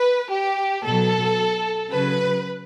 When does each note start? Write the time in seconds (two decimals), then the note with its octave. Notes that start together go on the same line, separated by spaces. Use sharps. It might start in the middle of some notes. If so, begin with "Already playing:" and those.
Already playing: B4
0.32 G4
0.85 B2 F#3 A4
1.90 C#3 F#3 B4